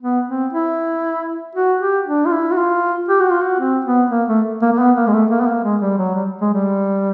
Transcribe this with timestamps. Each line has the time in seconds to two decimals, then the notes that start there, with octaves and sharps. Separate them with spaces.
0.02 B3
0.28 C4
0.53 E4
1.55 F#4
1.81 G4
2.07 D4
2.26 F4
2.32 E4
2.52 F#4
2.57 F4
3.09 G4
3.20 F#4
3.31 F4
3.43 F#4
3.60 C4
3.85 B3
4.11 A#3
4.28 A3
4.62 A#3
4.72 A#3
4.79 B3
4.96 A#3
5.07 G#3
5.13 A3
5.31 A#3
5.41 B3
5.47 A#3
5.64 G#3
5.81 G3
5.98 F#3
6.15 G3
6.41 G#3
6.53 G3